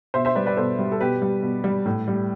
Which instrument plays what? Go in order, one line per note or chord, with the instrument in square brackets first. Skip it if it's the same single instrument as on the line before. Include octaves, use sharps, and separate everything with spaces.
[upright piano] B2 C5 E5
C5 E5
G3 B4 D5
B4 D5
B2 A4 C5
G3
A4
B2 G4 B4
G3
B2
G3
A2
G3